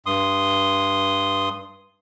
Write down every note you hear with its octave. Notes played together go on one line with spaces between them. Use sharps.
G2 C6 D#6